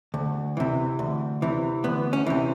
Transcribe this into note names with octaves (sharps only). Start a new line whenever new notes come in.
D2
C3 E3
D2
C3 E3
D2 B3
C#4
C3 E3